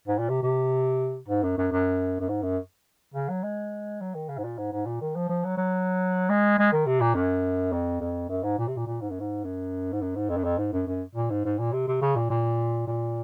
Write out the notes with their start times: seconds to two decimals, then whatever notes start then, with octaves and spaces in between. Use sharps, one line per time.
0.07 G#2
0.19 A#2
0.29 C3
0.43 C3
1.28 G#2
1.43 F#2
1.58 F#2
1.72 F#2
2.20 F#2
2.29 G#2
2.42 F#2
3.14 C#3
3.29 F#3
3.43 G#3
4.01 F#3
4.15 D#3
4.29 C#3
4.38 G#2
4.44 A#2
4.58 G#2
4.72 G#2
4.86 A#2
5.01 D#3
5.15 F3
5.29 F3
5.44 F#3
5.57 F#3
6.29 G#3
6.58 G#3
6.72 D#3
6.86 C3
7.00 A#2
7.15 F#2
7.72 F2
8.00 F2
8.29 F#2
8.43 G#2
8.59 A#2
8.68 C3
8.77 A#2
8.87 A#2
9.01 G#2
9.10 F#2
9.20 G#2
9.44 F#2
9.93 G#2
10.01 F#2
10.16 G#2
10.29 F2
10.37 F#2
10.44 F2
10.58 G#2
10.73 F#2
10.87 F#2
11.15 A#2
11.30 G#2
11.45 G#2
11.59 A#2
11.72 C3
11.87 C3
12.01 C#3
12.16 A#2
12.30 A#2
12.87 A#2